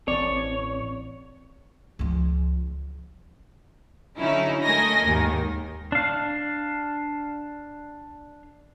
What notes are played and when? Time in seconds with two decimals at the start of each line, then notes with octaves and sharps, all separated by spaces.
0.08 A1 C4 C#5 D5
1.99 C#2 F3
4.18 D3 F#3 C#4 D#4 E4
4.63 A3 A#4 D#5 G#5 A#6
5.04 D#2 G#2 D#3
5.92 D4 F5